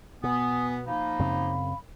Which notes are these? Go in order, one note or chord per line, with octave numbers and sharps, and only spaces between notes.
B2 B3 G#5 D#6
F3 A#3 D#4 F5 B5
F#2 C#3 C4